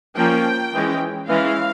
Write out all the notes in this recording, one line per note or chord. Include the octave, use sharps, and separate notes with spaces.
F3 A#3 C#4 G5
E3 G#3 C#4
E3 G#3 C#4 F5